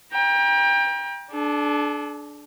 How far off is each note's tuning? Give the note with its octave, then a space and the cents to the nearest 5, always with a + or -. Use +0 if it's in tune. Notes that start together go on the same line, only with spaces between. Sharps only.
G5 +25 A#5 +35
D4 +0 A4 -45